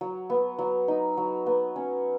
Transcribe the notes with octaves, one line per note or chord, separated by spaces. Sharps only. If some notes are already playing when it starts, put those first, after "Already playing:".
F#3
B3
F#3
D#4
F#3
B3
C#4